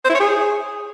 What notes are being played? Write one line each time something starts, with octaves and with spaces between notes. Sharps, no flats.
C5
E4
C#5
G#4